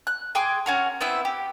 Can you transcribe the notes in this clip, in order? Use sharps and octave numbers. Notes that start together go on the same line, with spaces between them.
F#6
G#4 G5 C6 D6
C#4 F#4 A#4
B3 C4 E4 E5
G4